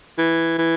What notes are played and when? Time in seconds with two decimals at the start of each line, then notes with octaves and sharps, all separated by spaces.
0.18 E3
0.58 E3